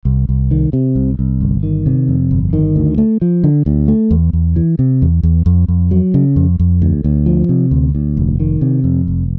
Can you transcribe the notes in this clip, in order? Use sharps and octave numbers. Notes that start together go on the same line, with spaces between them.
C2
C2
D#3
C3
C2
C2
G1
D#3
C3
F2
G1
D#3
D2
A3
F3
D3
D2
A3
E2
E2
E3
C3
E2
E2
F2
F2
F#3
C#3
F2
F2
D2
D2
F3
C3
D2
D2
F1
D#3
C3
F2
F1